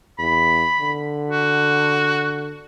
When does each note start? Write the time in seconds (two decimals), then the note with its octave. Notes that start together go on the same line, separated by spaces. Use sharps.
0.19 E2 B5
0.80 D3
1.30 F#4